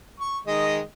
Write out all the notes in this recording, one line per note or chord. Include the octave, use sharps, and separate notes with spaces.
C#6
D#3 G#3 D#5